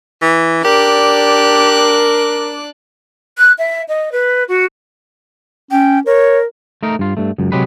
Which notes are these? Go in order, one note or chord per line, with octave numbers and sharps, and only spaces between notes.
E3
D4 G4 A#4 D5 F#6
F#6
E5
D#5
B4
F#4
C#4 G5
A#4 C#5
A3 D#4 A#4
G2 F4
G2 A3
C#2 F#2
C3 F#3 G#3 G4 B4